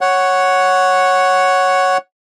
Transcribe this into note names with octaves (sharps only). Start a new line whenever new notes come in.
C#5 F#5